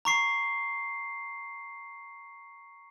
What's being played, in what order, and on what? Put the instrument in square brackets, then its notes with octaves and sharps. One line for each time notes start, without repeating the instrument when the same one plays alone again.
[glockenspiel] A#5 C#6 C7